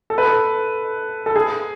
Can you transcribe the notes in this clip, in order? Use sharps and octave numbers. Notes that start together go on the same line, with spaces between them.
A4
B4
A4
A4
G#4